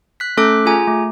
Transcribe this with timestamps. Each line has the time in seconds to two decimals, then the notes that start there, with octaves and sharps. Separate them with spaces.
0.20 F#6 B6
0.37 A3 C#4 A4 D6 F#6 B6
0.66 F4 G#4 G#5 A#5
0.87 A3